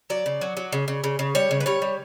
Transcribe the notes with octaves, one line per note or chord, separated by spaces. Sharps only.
F#3 D5
C#3
F#3
F#3
C#3
C#3
C#3
C#3
G3 C#5
C#3
B4
G3 C#5
G3